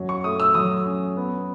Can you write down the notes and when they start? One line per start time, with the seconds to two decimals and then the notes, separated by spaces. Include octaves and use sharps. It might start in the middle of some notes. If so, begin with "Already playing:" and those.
Already playing: F#2 F#3
0.09 C#6
0.24 A3 D#6
0.40 E6
0.54 F#3 D#6
0.86 C#4
1.17 B3